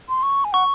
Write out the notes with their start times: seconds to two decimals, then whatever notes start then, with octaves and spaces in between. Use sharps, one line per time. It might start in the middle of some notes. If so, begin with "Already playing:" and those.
0.09 C6
0.23 C#6
0.45 G#5
0.53 F#5 C#6